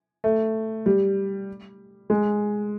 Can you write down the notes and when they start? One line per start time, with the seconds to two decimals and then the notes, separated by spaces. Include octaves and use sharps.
0.24 A3
0.86 G3
2.10 G#3